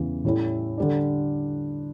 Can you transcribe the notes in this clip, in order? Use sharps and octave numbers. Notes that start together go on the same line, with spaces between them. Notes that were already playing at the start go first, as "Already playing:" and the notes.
Already playing: E2 C#3 E3 G3
A2 G3 C#4 E4
D3 G3 D4